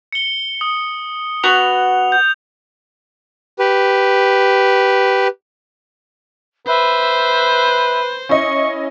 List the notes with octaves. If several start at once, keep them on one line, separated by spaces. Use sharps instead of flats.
C#7 G7
D#6
B3 F#4 C#6 F7
G6
G4 B4
B4 C5 E5
C#4 E4 D#5 C#6